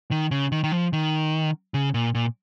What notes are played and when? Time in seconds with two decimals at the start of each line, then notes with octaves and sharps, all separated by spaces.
0.11 D#3
0.31 C#3
0.52 D#3
0.64 D#3
0.72 F3
0.93 D#3
1.74 C#3
1.94 A#2
2.15 A#2